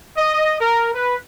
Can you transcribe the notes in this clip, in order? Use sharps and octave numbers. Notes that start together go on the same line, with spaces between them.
D#5
A#4
B4